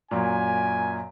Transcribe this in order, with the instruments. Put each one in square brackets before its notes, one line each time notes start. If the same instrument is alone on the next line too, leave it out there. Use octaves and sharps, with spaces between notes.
[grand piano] F#2 A#2 [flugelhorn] G#5